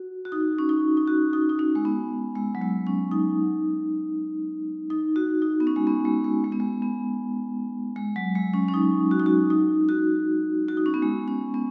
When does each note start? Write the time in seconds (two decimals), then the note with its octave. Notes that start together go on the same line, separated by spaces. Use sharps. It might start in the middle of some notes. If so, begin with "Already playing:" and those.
Already playing: F#4
0.25 F#4
0.32 D#4
0.58 C#4
0.69 D#4
0.97 D#4
1.08 F#4
1.33 D#4
1.49 D#4
1.59 C#4
1.75 G#3
1.85 B3
2.36 G#3
2.55 F#3
2.62 G#3
2.87 C#4
3.11 D#4
4.90 D#4
5.16 F#4
5.42 D#4
5.60 B3
5.67 C#4
5.76 G#3
5.87 B3
6.05 G#3
6.24 G#3
6.44 G#3
6.52 B3
6.60 G#3
6.82 B3
7.96 G#3
8.16 F#3
8.35 G#3
8.54 C#4
8.68 C#4
8.74 D#4
9.11 F#4
9.20 D#4
9.26 F#4
9.50 D#4
9.89 F#4
10.68 F#4
10.77 D#4
10.86 C#4
10.94 B3
11.03 G#3
11.28 C#4
11.54 B3